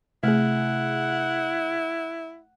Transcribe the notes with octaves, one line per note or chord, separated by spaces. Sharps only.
C3 A3 E4 G#4 F#5